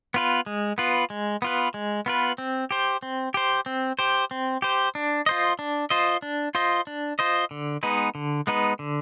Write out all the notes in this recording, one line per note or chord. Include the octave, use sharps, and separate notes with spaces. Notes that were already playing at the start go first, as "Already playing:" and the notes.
B3 F4 B4
G#3
B3 F4 B4
G#3
B3 F4 B4
G#3
B3 F4 B4
C4
G4 C5
C4
G4 C5
C4
G4 C5
C4
G4 C5
D4
F4 C5 D#5
D4
F4 C5 D#5
D4
F4 C5 D#5
D4
F4 C5 D#5
D3
G#3 B3 D#4 B4
D3
G#3 B3 D#4 B4
D3